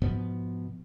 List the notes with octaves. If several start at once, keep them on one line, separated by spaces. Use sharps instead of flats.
G#2 B2 F3 B3